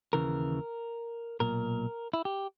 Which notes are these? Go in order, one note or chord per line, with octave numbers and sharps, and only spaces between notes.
D#2 C#3 E3 A#4
B1 A#2 A#4
E4
G4